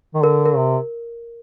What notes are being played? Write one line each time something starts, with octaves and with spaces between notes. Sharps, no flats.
D#3
D3 A#4
A#4
C3